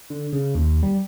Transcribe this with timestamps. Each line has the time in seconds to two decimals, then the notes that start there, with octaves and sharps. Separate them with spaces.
0.10 D3
0.33 C#3
0.55 D#2
0.83 G3